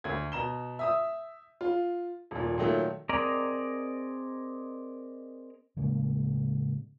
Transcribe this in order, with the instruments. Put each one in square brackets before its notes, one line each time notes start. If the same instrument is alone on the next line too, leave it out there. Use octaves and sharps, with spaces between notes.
[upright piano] D2 G#6
B2 A#5 E7 G7
E5 D#6 E6
F4
D#1 A#2
A#2 D#3 F#3 A3
[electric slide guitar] C4 G#4 A#4 D5 D#5 A#5
[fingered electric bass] A2 C#3 G#3 A#3